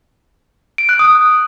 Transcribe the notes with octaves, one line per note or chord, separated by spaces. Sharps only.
D7
F#6
D#6